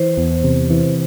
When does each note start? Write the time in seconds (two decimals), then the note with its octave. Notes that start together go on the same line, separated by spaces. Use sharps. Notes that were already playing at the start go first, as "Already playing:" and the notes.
Already playing: E3 C5
0.17 E2
0.44 C3
0.70 E3